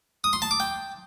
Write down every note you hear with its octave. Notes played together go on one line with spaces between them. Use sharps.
D#6
C6
A5
D6
G5